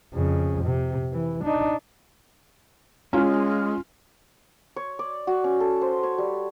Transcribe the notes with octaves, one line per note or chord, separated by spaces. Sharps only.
F2 C#3
C3
E3
D4 D#4
G#3 C#4 F4
C#5
D5
F#4
C#4
A4
C5
C#5
G3